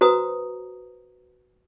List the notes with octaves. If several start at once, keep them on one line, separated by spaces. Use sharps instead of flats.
F#4 B4 C5 A#5 D#6